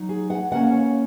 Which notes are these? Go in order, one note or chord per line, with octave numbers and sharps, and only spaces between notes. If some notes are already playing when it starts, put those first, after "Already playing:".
Already playing: F#3 D#4
G#4
F#5
C#3 A#3 C#4 F#5
C#5